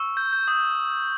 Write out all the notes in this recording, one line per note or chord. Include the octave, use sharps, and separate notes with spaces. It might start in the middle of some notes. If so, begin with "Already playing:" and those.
Already playing: C#6 E6
G6
G6
D#6 G6